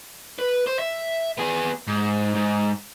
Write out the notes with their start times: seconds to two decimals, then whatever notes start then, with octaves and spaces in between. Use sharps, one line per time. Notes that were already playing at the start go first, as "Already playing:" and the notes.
0.39 B4
0.67 C5
0.79 E5
1.38 B3 G#4
1.87 G#2
2.35 G#2